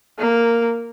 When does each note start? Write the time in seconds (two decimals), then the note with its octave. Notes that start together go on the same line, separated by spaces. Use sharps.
0.18 A#3